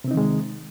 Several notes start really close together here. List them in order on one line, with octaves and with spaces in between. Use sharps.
C3 C4 D#4 D#3 G#3